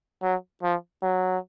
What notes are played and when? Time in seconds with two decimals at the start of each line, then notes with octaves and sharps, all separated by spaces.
0.23 F#3
0.63 F3
1.02 F#3